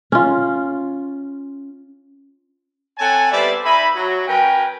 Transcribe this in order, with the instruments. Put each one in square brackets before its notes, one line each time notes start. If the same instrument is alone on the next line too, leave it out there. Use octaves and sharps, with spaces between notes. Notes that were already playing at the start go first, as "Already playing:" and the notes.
[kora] C#4 F4
[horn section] C4 A4 C#5 F#5 G#5 A5
G3 B3 A4 C5 D5 E5
D#4 E5 G#5 B5
F#3
C#4 A#4 B4 G5